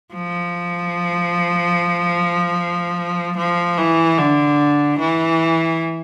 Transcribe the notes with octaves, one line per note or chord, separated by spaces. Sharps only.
F3
F3
E3
D3
E3